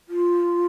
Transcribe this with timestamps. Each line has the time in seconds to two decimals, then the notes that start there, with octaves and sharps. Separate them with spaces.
0.09 F4